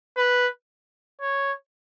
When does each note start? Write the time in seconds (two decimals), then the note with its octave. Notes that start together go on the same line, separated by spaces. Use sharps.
0.17 B4
1.21 C#5